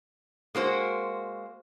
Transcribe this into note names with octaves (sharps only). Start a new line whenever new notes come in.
G#3 A#3 F#4 C5